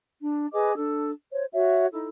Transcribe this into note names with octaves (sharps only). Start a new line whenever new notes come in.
D4
G#4 B4 D#5 D6
D4 A4
C5 C#5
F#4 C#5 E5
D#4 E4 A4